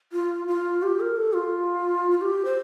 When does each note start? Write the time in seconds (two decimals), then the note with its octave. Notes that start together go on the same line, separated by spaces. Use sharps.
0.12 F4
0.47 F4
0.83 G4
1.00 A#4
1.16 A4
1.35 F4
2.11 F4
2.21 G4
2.45 C5